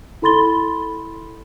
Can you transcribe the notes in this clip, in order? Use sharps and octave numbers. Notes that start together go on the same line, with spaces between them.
E4 A4 B5 C6 A6 G7